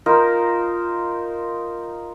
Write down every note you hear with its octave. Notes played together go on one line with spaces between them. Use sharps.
D#4 F4 A#4 C5